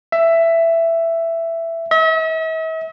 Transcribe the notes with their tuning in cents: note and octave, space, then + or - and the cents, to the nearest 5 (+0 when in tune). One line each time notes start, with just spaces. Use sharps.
E5 +10
E5 -45